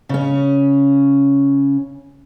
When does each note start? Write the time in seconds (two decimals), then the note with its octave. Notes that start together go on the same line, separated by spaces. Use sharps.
0.09 C#3 C#4